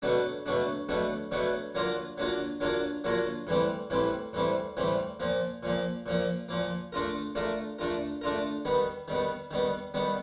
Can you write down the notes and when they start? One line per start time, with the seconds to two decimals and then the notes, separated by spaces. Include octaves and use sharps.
0.02 B2 F#3 A3 D4
0.46 B2 F#3 A3 D4
0.89 B2 F#3 A3 D4
1.31 B2 F#3 A3 D4
1.75 F#3 A#3 D4 F4 A#4
2.18 F#3 A#3 D4 F4 A#4
2.60 F#3 A#3 D4 F4 A#4
3.04 F#3 A#3 D4 F4 A#4
3.47 A2 E3 G3 C4
3.90 A2 E3 G3 C4
4.33 A2 E3 G3 C4
4.77 A2 E3 G3 C4
5.20 A#2 F3 A#3
5.63 A#2 F3 A#3
6.06 A#2 F3 A#3
6.49 A#2 F3 A#3
6.92 A3 D4 F4 A#4
7.35 A3 D4 F4 A#4
7.79 A3 D4 F4 A#4
8.21 A3 D4 F4 A#4
8.65 D#3 G3 B3
9.08 D#3 G3 B3
9.51 D#3 G3 B3
9.94 D#3 G3 B3